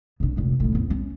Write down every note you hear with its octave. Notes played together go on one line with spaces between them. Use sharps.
C#3 D4
F1 A#1
A2 D#3
E2 B3
B3 C#4